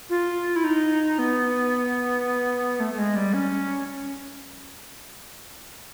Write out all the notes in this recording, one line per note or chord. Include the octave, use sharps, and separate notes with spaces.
F4
E4
D#4
B3
A3
A3
G#3
G3
C#4